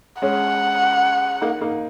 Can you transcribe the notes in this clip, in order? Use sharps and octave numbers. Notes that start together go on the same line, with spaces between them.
G#3 C#4 F#5
A#3 D#4
A#3 D#4